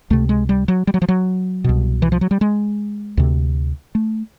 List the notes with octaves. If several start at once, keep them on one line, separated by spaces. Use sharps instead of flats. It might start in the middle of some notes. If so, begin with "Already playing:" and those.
C#2 C3 A3
G#3
G3
F#3
G3
F#3
F3
F#3
C2 B2
E3
F3
F#3
G3
G#3
D2 C3
A3